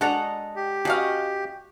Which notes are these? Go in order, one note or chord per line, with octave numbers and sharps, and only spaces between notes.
G#3 D4 F#4 A4 F#5 A#5
G4
C#3 F#4 D#5 F5